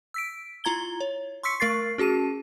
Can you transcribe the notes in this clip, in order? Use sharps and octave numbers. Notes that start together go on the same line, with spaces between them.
E6 B6 D7
E4 F4 A#5 G#6 G7
C#5
C6 C#6 E6 B6 C#7
A3 A#4 C#6 A6 C7
C#4 F#4 G#4 A5 D#7